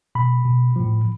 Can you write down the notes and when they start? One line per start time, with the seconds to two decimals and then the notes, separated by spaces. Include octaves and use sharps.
0.15 B2 B5
0.45 B2
0.76 A2 F3